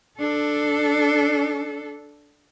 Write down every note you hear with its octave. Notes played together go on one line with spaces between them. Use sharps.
D4 A4